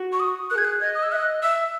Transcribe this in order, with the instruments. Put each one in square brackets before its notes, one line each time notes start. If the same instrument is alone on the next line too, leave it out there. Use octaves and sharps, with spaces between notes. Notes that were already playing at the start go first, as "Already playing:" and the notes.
Already playing: [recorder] F#4
[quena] C#6
D#6
[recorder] A#4 [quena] F#6
[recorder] G#4 [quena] G#6
[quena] F#6
[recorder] D#5 [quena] G#6
[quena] D#6
E6
[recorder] E5 [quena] F#6
[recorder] D#5
[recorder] E5 [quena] E6